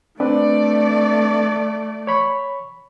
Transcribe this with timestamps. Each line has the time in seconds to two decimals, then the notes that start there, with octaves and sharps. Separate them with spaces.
0.20 A3 C4 D4 B4 D5
2.07 C#5 B5 C#6